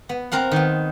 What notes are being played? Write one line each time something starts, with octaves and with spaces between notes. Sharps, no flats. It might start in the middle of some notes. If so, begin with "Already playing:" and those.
B3
C4 A#4 F5 F#5
D#3 B3